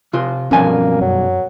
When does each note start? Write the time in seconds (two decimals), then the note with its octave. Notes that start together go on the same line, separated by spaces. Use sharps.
0.13 C3 F4
0.51 B1 G2 F3 A#3 C4 C#4 G#5
1.01 F#2 F#3